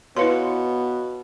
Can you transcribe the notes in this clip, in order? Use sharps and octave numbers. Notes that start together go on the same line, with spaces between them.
B2 B3 E4 B4 C#5 F5 C6 C#7